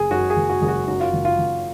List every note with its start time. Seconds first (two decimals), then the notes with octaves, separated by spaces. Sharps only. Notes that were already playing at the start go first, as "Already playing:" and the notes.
Already playing: F#1 G#4
0.11 F#2 F#4
0.30 G#4
0.36 F#1
0.49 F#4
0.62 F#1 G#4
0.68 F#4
0.88 F#2 F#4
1.00 F4
1.13 F#1
1.25 F4
1.38 F#1